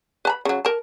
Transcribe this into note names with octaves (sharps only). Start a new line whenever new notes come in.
B4 A5 B5
C#3 F#3
A#4 A5